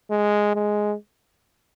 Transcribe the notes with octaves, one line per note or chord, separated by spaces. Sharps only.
G#3
G#3